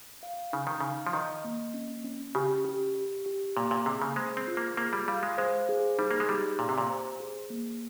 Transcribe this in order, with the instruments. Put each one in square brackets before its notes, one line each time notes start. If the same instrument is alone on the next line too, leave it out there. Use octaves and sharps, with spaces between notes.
[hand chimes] F5
[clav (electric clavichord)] C#3 [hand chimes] D#4
[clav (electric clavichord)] D#3
[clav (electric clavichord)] C#3 [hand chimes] F5
[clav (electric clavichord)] F3
[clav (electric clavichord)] D#3 [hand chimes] D#5
[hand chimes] A#3
C#4
C#4
[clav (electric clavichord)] C#3 [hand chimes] G4
[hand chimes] G4
G4
G4
[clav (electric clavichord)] A#2 [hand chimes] A#3
[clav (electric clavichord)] A#2
[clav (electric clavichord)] C3 [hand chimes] G#4
[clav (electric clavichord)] C#3
[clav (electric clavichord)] G#3 [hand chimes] C5
[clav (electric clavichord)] C4
[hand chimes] F4
[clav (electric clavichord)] A#3
[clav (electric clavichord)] A#3 [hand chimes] G#4
[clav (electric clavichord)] G3
[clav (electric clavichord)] G3 [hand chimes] F5
[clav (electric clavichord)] G#3
[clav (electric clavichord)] G#3 [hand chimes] C5
[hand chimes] G#4
[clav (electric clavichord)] G3 [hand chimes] D#4
[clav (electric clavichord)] A#3
G#3
[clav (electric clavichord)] G3 [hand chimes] G4
[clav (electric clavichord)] A#2 [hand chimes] G4
[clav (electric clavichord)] C3
A#2
[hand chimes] C5
G#4
A#3